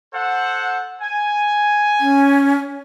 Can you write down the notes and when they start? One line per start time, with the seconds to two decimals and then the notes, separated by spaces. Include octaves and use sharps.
0.13 A4 C5 F#5
1.02 G#5
2.00 C#4